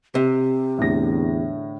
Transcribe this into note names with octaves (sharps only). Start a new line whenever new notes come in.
C3 G4
E2 A2 D3 A#6